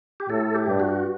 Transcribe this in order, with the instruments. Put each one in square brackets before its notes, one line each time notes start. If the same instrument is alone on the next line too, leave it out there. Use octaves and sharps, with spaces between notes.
[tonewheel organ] G4
[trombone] A2 [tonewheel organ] A4
[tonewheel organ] G4
[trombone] G2
[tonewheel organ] F#4